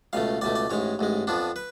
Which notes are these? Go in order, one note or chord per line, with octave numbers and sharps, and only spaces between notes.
C#2 B2 A3 F5
C#2 B2 A3 D5
D5
A1 G#2 G#3 C#5
A1 G#2 G#3
F2 F3 B3 D4
B4